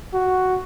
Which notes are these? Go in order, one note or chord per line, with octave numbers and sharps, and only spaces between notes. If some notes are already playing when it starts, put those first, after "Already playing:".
F#4